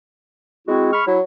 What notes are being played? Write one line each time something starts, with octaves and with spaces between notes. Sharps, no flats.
G#3 C4 E4 F#4
B5 C#6 F6
F#3 E4